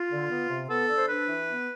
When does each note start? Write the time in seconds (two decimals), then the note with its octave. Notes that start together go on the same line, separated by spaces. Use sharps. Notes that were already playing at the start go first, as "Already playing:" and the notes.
Already playing: F4
0.10 D3
0.29 B3
0.49 C3
0.69 B3 A4
0.88 D3
0.97 C5
1.07 D4 B4
1.27 E3
1.48 B3